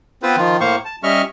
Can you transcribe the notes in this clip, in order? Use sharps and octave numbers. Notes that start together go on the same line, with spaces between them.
B3 C4 F4 B4 C5
D#3 F3 F4
A2 A#3 C5 F5 C#6
A5
G3 C#4 D#5 E5 C#6 F6